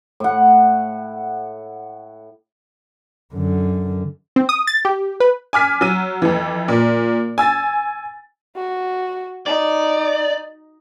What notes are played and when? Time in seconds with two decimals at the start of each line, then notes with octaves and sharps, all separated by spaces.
0.20 A2 F#5
3.34 F#2 D3
4.36 C4
4.49 D#6
4.67 A6
4.85 G4
5.20 B4
5.53 G#5 D6 F6 B6
5.81 F#3 E6 D#7
6.22 F2 E3
6.68 A#2
7.38 G#5 E6 A6
8.56 F#4
9.46 D#4 D5